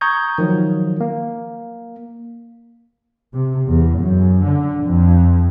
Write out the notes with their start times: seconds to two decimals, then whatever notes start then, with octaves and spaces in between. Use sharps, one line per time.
0.01 A#5 C#6 D#6 G6 G#6
0.38 D#3 F3 F#3
1.00 A#3
3.34 C3
3.68 E2
3.99 F#2
4.45 D3
4.86 F2